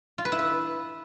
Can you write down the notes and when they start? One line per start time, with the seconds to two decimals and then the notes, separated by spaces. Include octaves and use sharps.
0.18 F4
0.25 B4
0.32 E4
0.39 B4